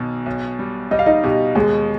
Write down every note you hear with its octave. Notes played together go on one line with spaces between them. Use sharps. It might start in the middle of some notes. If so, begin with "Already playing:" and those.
Already playing: B1 B2 D#3
B1
G3
G3 D#5
F5
D#4 D#5
B2 G4
D#2 G#3 G#4